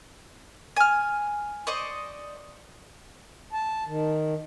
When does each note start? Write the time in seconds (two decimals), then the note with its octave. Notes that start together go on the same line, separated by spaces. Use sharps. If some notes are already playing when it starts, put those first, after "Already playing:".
0.77 G#5 F6
1.67 C5 D5 D#5 C#6
3.53 A5
3.86 D#3